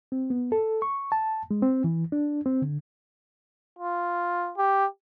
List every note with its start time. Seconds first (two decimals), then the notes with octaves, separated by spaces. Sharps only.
0.12 C4
0.30 B3
0.52 A4
0.82 C#6
1.12 A5
1.51 G#3
1.62 C4
1.84 E3
2.12 D4
2.46 C4
2.62 D3
3.79 F4
4.58 G4